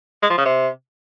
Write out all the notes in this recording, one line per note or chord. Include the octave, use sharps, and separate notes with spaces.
G#3
F3
C#3
C3